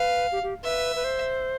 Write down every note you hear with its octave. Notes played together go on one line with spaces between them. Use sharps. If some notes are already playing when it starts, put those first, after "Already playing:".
Already playing: B4 F5
G4
G4
B4 E5
B4
C5